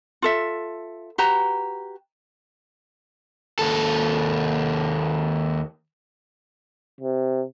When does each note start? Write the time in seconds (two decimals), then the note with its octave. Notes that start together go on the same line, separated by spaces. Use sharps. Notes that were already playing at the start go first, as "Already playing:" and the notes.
0.22 F4 A4 E5
1.18 F#4 G4 B4 A#5
3.59 D#2 A4
7.01 C3